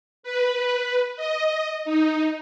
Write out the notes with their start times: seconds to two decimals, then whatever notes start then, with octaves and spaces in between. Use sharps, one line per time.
0.23 B4
1.17 D#5
1.85 D#4